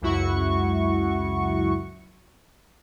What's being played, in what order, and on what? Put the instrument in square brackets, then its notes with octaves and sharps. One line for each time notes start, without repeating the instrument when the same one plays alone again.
[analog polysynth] C#2 F#2 E4 F#4 C#6